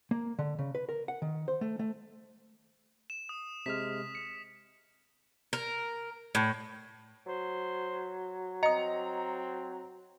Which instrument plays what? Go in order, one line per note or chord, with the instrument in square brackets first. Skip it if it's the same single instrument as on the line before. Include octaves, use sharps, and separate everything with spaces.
[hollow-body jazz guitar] A#3
D3
C#3
B4
A#4
F#5
D#3
C5
A3
A3
[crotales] E7
D#6
[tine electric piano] C3 G#3 F6 [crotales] B6
[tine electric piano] C#7
[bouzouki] A#4
A2
[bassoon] F#3 [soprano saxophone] C5
[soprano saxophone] C4 [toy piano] D#5 D#6 [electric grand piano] A#5 C#7